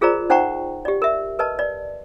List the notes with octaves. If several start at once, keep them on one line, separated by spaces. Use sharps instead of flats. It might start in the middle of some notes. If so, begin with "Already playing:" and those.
F4 G#4 A#4 C5 D5 A#5
D#4 C5 F#5 G5 A#5 C#6
G4 D5
A#4 E5
A#4 B4 D#5 A5
D5